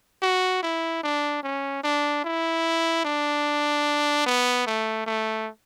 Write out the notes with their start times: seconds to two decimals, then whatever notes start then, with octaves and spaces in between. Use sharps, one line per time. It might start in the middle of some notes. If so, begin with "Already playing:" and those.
0.22 F#4
0.63 E4
1.03 D4
1.43 C#4
1.84 D4
2.24 E4
3.05 D4
4.26 B3
4.66 A3
5.07 A3